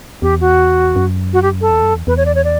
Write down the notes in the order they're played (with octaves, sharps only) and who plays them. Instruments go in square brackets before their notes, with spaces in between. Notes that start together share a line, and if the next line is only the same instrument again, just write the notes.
[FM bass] E2 [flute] G4
[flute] F#4
[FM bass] F#2
[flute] F#4
G4
A4
[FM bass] E2
F#2
E2
[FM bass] E2 [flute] B4
[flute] C#5
D5
C#5
D5